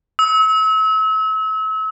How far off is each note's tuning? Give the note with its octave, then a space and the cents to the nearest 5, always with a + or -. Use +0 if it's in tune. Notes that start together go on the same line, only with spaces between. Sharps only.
E6 -35